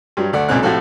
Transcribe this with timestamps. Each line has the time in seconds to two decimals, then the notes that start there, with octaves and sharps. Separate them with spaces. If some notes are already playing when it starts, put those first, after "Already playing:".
0.17 G2 F#3 G3
0.33 D2 A3 D5 F#5
0.48 B1 A#2 C#3 G#3 C4 F#6
0.62 A2 C3 F3 F#4 A4